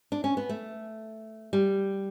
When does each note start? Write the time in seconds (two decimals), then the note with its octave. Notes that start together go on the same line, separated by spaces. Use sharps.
0.12 D4
0.24 C#4
0.37 B3
0.49 A3
1.53 G3